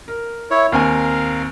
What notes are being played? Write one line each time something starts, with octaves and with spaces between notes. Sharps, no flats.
A#4
E4 C#5
D#2 C4 A#4 F5 G#5